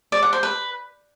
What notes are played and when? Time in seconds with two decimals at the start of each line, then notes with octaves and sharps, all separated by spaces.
0.12 D5
0.22 F#5
0.33 C5
0.43 B4